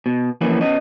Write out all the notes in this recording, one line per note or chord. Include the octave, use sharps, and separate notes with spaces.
B2
E3 F3 A#3 C#4 A4 B4
B3 C#4 D#5